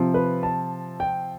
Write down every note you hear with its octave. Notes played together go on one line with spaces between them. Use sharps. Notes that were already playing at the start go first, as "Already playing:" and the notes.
Already playing: C3 F3
B4
A5
G5